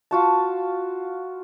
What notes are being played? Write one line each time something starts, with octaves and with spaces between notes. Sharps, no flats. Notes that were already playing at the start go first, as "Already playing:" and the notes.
F4 F#4 A5